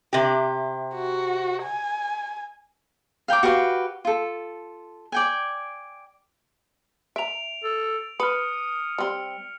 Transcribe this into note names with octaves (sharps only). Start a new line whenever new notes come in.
C3 G4
F#4
G#5
F5 G5 A#5 D6
F#4 G4 B4 F5
F4 A4
D5 G5 G#5
E5 A#5 D7 F7
A4
B4 D#6 F6 C#7
G3 C4